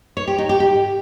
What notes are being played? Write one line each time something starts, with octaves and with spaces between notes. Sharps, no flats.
C#5
G4
D#4
G4
G4